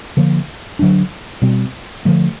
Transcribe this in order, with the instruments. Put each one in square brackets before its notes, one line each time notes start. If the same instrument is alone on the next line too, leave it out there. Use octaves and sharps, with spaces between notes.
[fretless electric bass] D3 F3 A#3
D3 F#3 B3 D4
B2 G3 C4
D3 F3 A3